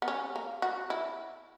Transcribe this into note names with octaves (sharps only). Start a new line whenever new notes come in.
B3
C#4
A#3
F#4
E4